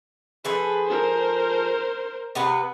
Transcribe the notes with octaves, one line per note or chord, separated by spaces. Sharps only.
F3 G#4 A4 B4
A#4 C5
C3 B3 B4